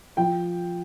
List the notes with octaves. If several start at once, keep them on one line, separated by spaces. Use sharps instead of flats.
F3 G5